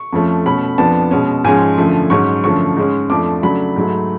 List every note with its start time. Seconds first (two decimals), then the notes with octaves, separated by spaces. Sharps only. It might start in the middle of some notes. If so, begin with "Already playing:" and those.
Already playing: C#6
0.12 F2 F3 A3 C#4
0.45 B2 A3 C#4 B5
0.78 F2 F3 B3 D4 A5
1.11 B2 G#3 C#4
1.44 G#2 F3 G#3 C#4 G#5
1.78 F#2 D3 F3 A3
2.10 G#2 F#3 C#4 C#6
2.44 F#2 D3 F3 A3 C#4 C#6
2.77 G#2 G#3 C#4
3.10 F2 F3 A3 D4 D6
3.43 C#3 F#3 A3 D4 B5
3.76 G#2 F#3 A3